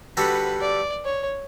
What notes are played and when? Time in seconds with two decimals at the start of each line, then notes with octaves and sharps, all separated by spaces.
0.17 D3 G3 D4 F#4 A4 B4
0.61 D5
1.05 C#5